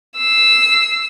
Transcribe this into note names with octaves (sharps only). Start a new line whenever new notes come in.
E6 C7